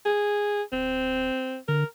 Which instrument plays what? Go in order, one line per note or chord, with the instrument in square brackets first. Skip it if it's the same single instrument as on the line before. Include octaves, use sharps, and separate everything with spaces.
[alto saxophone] G#4
[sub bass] D1 [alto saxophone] C4
[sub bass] D3 [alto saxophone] A#4